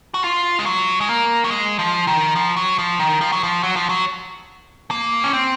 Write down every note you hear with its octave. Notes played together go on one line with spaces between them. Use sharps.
F#4
F4
G#3
F#3
G#3
A#3
F#3
G#3
F3
D#3
F3
F#3
F3
D#3
F3
F#3
F3
F#3
F3
F#3
A#3
C#4
C4